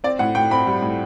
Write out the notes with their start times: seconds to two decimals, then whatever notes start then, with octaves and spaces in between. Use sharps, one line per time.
0.04 C4 D5
0.19 A2 F#5
0.35 A2 G5
0.51 C4 B5
0.67 G3
0.82 A2